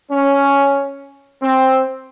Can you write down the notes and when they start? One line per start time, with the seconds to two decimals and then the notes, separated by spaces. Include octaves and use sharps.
0.12 C#4
1.42 C4